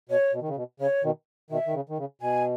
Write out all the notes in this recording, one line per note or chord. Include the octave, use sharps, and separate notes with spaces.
B2 C#5
B2
D#3
C#3
B2
C#3 C#5
B2 D#3
B2 D#3 E5
D#3
C#3
D#3
C#3
B2 G#5